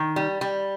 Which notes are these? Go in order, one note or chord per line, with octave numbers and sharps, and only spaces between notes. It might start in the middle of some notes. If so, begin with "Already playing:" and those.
Already playing: D#3
G3
G3